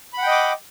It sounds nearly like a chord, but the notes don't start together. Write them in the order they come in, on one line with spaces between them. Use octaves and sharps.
B5 F#5 G5 D#5 D6